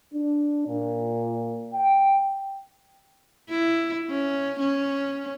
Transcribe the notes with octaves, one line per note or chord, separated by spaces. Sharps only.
D4
A#2
G5
E4
C#4
C#4